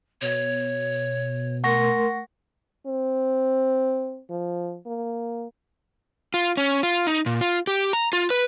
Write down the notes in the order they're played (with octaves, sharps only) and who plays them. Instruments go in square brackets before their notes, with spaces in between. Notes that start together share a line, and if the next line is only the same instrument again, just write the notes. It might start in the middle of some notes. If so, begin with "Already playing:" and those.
[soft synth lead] B2 [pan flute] C#5
[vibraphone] A3 A#4 C6 [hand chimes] F#5 C#6 A#6
[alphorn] C4
F3
A#3
[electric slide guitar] F4
C#4
F4
D#4
A#2
F4
G4
A#5
F4
B4